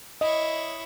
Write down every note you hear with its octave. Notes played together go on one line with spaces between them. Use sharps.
E4 C#5 D#5